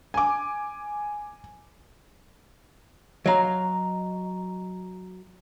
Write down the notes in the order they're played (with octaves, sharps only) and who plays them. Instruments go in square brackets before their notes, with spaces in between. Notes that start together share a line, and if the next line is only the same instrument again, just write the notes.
[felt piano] G#5 D6
[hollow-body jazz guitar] F#3 F5 [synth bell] D#5 A#5